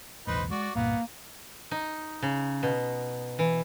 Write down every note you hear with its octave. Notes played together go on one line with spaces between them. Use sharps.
B1 E2 A2 D#4 B4 C5
G#3 F#4 D5
C2 G2 A#2 A#3 B3
D#4
C#3
B2
E3